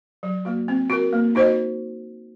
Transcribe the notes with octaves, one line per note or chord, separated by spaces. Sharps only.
F#3
A#3 F#4
C4
F#4 A#4
A#3
D#4 F#4 C5 D#5